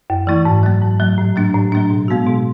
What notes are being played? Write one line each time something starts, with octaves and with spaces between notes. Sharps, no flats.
F#2
E3 A3 E4
G#2
F#3 A3
G#2
F#3 A3
A2
F#3 A3 D4
A2
F#3 A3 D4
B2
G#3 B3 F#4
B2